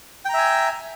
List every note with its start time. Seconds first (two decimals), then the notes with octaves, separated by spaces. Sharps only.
0.25 G5
0.29 A#5
0.34 E5
0.38 G#5